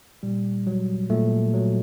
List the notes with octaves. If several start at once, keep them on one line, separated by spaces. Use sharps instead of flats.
A#2 G3
F#3
A#2 A3
F#3